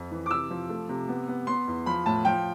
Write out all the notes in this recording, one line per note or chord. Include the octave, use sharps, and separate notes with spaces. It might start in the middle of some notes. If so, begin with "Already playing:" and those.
Already playing: F2
E3
D6
C3 E6
F3
A3
C3
B3
B3
B3 C6
E2
F3 B5
A2 A5
F3 G5